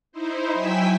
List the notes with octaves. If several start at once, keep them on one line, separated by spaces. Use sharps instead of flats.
D#4 E4 C5
F#3 E4 G5 G#5 E6 B6